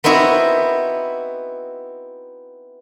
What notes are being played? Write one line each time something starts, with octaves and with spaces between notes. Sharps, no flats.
B3 C4 D#4 E4 F#4